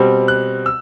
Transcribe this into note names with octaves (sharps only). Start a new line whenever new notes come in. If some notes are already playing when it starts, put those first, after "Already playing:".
Already playing: B2 G3 C4
F#6
E6